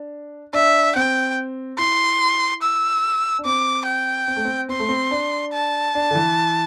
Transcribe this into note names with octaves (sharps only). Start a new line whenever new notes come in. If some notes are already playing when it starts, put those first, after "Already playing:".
Already playing: D4
D4 E5
C4 G5
E4 C6
E6
D4
C4 D6
G5
C4
A3
C4
C4 C6
A3
C4
D4
A5
D4
D3
E3